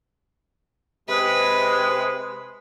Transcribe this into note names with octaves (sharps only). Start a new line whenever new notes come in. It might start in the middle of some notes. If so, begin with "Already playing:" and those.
C3 G#3 B4